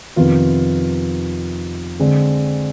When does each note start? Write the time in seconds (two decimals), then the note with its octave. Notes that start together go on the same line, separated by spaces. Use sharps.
0.16 F2 C3 D#3 B3 F4
1.99 D3 G#3 C4